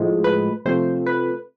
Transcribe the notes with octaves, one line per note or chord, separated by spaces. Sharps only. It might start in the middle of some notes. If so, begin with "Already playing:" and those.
Already playing: A2 F3 G#3
B4
C3 F3 A3 C5
B4